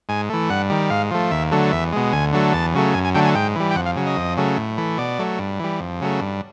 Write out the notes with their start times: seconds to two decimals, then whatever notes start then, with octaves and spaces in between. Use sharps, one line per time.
0.09 G#2 G#5
0.30 E3 A3
0.50 G2 F#5
0.70 D#3 G3
0.90 G#2 F5
1.11 F3 A3
1.31 D#2 E5
1.52 D3 F#3 A3
1.72 E2 E5
1.93 B2 G#3
2.12 D2 G#5
2.33 D3 F#3 A3
2.53 E2 A5
2.74 C#3 F#3 A3
2.94 F#2 G#5
3.05 G#5
3.15 D3 F#3 A3 G5
3.25 G#5
3.35 G#2 G5
3.56 E3 G3
3.71 G5
3.76 F2 F#5
3.86 F5
3.96 C#3 F#3
4.06 D#5
4.17 F2
4.37 C#3 F#3 A3
4.58 A2
4.78 E3 A3
4.98 B2 D5
5.19 F#3 A3
5.39 G2
5.60 E3 G3
5.80 F2
6.01 C#3 F#3 A3
6.21 G2